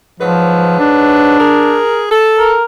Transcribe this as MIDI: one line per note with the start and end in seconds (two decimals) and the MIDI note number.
0.20 1.39 44
0.20 0.76 53
0.20 1.39 54
0.20 1.39 71
0.79 1.80 62
1.40 2.07 68
1.40 2.07 70
2.11 2.57 69
2.37 2.64 70